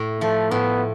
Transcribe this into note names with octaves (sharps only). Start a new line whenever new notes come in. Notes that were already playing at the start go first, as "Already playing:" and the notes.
Already playing: A2
F3 A3
A2 B3